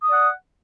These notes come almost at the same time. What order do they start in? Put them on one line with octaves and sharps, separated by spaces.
D#6 D5 F#5